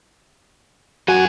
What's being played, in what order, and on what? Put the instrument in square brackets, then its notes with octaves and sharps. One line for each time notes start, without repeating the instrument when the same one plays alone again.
[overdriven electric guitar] F#3 G#5 [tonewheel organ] F#4